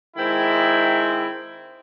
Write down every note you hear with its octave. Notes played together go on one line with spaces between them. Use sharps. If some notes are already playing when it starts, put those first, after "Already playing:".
D#3 G#3 C4 E4